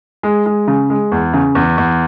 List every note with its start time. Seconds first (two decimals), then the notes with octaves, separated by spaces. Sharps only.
0.23 G#3
0.46 G#3
0.68 C#3
0.90 G#3
1.12 E2
1.33 C#3
1.55 E2
1.78 E2